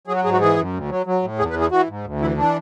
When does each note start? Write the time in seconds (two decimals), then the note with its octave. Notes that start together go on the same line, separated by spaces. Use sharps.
0.07 F#3 G#4
0.16 F#4
0.24 G#2 G#4
0.33 F#4
0.41 E3 G#4
0.57 F#2
0.73 D2
0.89 F#3
1.06 F#3
1.23 A2
1.39 E2 G#4
1.50 B4
1.55 E3
1.61 G#4
1.71 E3 F#4
1.88 G#2
2.04 D2
2.21 E3 E4
2.37 E3 D4